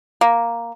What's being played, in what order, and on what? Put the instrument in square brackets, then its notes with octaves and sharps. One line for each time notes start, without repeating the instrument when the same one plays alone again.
[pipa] A#3